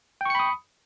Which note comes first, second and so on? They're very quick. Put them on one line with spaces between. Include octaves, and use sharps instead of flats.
G5 C#6 C#7 B5 D#6